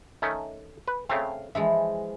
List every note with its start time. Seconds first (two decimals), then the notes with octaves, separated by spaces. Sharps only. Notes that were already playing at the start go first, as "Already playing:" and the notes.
0.22 D#3 A3 C#4
0.88 B4
1.09 C#3 A3 C4 F5
1.55 E3 F3 G#3 E5